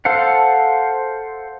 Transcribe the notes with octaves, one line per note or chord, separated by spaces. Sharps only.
A4 C5 F5 F#5